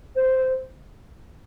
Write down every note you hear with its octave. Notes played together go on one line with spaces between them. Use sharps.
C5